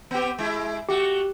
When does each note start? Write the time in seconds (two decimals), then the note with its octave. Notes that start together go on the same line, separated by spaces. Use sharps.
0.11 B3 C4 G4
0.39 G#3 E4
0.89 A3 F#4 G4